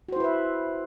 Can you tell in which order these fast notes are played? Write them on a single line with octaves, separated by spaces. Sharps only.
F#4 C5 E4 B4 E5